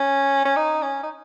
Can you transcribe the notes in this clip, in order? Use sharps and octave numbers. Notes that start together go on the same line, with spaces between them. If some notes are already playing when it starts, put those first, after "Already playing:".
Already playing: C#4
C#4
D#4
C#4
D#4